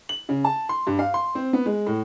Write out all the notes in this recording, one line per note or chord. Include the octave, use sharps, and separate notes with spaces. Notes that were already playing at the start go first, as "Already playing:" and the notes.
F#7
C#3
A5
C6
G2
F5
C6
C4
B3
G#3
A2